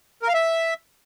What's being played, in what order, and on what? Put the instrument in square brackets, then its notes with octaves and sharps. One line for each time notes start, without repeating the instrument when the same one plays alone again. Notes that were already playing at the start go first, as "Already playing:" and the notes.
[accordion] A#4
F5
E5